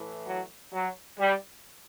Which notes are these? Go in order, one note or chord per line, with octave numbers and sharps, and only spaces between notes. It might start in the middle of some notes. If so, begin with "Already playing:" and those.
Already playing: A2 E3
F#3
F#3
G3